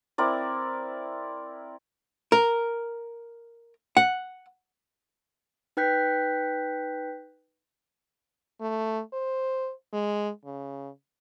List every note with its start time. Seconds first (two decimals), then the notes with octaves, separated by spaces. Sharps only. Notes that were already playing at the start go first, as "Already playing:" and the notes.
0.18 C4 E4 A#4 D5
2.32 A#4
3.97 F#5
5.77 D#4 B4 G5 F#6 G6 B6
8.61 A3
9.13 C5
9.93 G#3
10.45 C#3